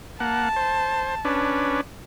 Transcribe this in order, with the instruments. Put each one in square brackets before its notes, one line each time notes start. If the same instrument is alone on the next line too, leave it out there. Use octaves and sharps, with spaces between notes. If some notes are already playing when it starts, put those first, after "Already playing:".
[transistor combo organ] A#3 F#5 [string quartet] A5
[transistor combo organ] C5
C#4 D4 B4